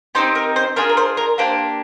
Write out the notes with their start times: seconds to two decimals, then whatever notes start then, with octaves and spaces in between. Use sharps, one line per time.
0.15 C4 D#4 G4 C5
0.35 A#4
0.56 C5
0.76 D4 F4 G#4 A#4
0.89 A#4
0.97 C5
1.17 A#4
1.38 A#3 D4 G4 C5